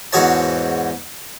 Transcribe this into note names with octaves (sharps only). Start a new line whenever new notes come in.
E2 G#2 F#4 G#4 C#5 A5